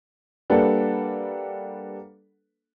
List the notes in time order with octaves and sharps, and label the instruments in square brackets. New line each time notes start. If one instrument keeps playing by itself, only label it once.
[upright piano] G3 A#3 D4 A4 B4 F#5